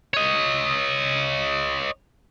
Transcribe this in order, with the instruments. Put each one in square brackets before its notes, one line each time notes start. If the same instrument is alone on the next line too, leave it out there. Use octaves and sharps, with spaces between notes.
[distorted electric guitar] C#5 D#5